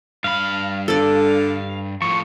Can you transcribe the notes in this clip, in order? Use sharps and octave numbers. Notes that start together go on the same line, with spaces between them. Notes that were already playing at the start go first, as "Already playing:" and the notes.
G2 F5 B5
D3 A4 D5
A2 F3 C#6